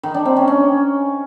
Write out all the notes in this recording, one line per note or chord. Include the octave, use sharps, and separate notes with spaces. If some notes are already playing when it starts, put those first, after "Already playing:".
D#3
D4
C4
C#4
C#4